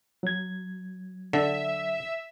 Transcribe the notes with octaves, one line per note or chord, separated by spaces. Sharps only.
F#3 G#6
D3 E5